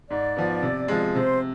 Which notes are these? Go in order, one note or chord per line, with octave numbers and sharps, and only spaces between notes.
G#2 D5
F3 B3
C3
F3 G#3
C3 C5